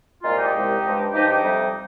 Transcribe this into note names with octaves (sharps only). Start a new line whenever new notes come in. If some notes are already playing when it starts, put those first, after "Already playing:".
C2 A#2 G#3 F4
D#4 G4
C2 A#2 G#3
G2 F3 G#3
G2 F3 G#3 D#4 G4
D#4 G4
F2 C3 G3